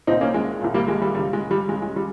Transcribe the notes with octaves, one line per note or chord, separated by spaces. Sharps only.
C2 A#2 C4 D#4
A#3 C#4
G#3
C2 A#2
G3 A#3
G#3
G3
C#2 C#3 G3
G#3
G3
C#2 C#3 G#3
G#3
G3